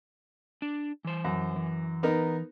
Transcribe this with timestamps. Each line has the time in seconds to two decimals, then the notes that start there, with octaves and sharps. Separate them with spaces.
0.62 D4
1.05 E3 C5
1.24 F#2
1.56 E3
2.03 B3 D#4 A#4